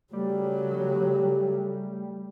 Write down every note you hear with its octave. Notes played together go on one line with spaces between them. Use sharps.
C#3 F#3 G3 A3 G4